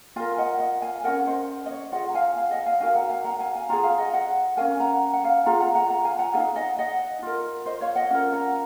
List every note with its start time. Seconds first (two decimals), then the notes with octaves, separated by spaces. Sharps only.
0.16 F4 A#4 F5 G#5
0.38 D#5 F#5
0.60 D#5 F#5
0.82 F5 G#5
1.04 C#4 F#4 A#4 D#5 F#5
1.27 C5 D#5
1.66 D#5
1.71 C#5
1.92 F4 G#4 D#5 F#5
2.09 A#5
2.15 F5 G#5
2.36 F5 G#5
2.51 D#5 F#5
2.66 F5 G#5
2.81 D#4 F#4 A#4 F5 G#5
2.95 F#5 A#5
3.10 F5 G#5
3.25 F#5 A#5
3.40 F5 G#5
3.55 F5 G#5
3.69 F4 G#4 F#5 A#5
3.83 F5 G#5
3.98 D#5 F#5
4.13 D#5 F#5
4.57 C#4 F#4 A#4 F5 G#5
4.80 F#5 A#5
5.13 F#5
5.24 F5 G#5
5.45 F4 G#4 F#5 A#5
5.60 F#5 A#5
5.75 F#5 A#5
5.90 F#5 A#5
6.04 F5 G#5
6.19 F#5 A#5
6.34 D#4 G#4 F5 G#5
6.56 D#5 F#5
6.79 D#5 F#5
7.22 F4 A#4
7.66 C5 D#5
7.81 C#5 F5
7.96 D#5 F#5
8.10 C#4 F4 A#4
8.33 F#5 A#5